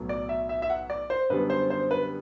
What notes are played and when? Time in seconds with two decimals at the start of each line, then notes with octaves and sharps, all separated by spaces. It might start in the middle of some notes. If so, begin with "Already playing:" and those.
Already playing: B1 A2 F#3 B3
0.09 D5
0.29 E5
0.49 E5
0.62 E5
0.70 F#5
0.90 D5
1.10 C5
1.29 F#2 D3 G3 B3 B4
1.50 C5
1.70 C5
1.91 B4